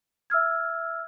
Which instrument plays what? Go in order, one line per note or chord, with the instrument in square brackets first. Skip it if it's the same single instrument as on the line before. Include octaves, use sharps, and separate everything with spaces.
[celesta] E5 E6 F6 G#6